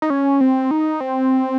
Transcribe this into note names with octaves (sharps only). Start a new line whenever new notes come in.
D#4
C#4
C4
D#4
C4